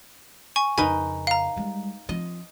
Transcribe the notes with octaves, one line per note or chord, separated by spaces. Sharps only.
G#5 C#6
F2 C#3 D#4 A#4 B4 G#5
F5 A#5
G3 G#3
F3 C4 D#5